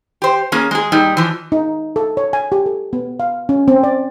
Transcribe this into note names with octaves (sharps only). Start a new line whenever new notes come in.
G4 C5
A#3 C#4 G#4
G#3 G#4
A#2 G3 D#4
E3 F3
D#4
A4
C#5
G#5
G4
A4
B3
F5
C#4
C4
D5